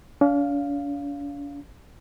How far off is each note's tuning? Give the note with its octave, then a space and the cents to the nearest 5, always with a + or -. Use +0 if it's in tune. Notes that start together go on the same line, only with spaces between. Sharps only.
D4 -45 F5 +0